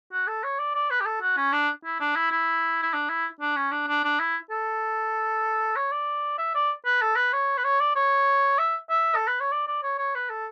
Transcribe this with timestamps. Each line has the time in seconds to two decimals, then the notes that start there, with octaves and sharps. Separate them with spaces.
0.12 F#4
0.27 A4
0.43 C#5
0.59 D5
0.75 D5
0.90 B4
1.00 G4
1.05 A4
1.22 F#4
1.37 C#4
1.53 D4
1.85 E4
2.00 D4
2.16 E4
2.32 E4
2.82 E4
2.93 D4
3.09 E4
3.41 D4
3.56 C#4
3.72 D4
3.87 D4
4.04 D4
4.20 E4
4.50 A4
5.76 C#5
5.92 D5
6.38 E5
6.55 D5
6.85 B4
7.02 A4
7.16 B4
7.33 C#5
7.57 B4
7.64 C#5
7.80 D5
7.95 C#5
8.58 E5
8.90 E5
9.15 A4
9.27 B4
9.40 C#5
9.52 D5
9.67 D5
9.83 C#5
9.98 C#5
10.15 B4
10.30 A4